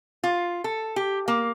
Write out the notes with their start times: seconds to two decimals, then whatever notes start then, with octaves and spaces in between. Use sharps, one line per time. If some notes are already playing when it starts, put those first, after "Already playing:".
0.24 F4
0.64 A4
0.96 G4
1.28 A#3